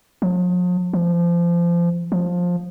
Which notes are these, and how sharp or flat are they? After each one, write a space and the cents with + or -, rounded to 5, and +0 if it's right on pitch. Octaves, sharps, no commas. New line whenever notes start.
F3 +45
F3 -25
F3 +15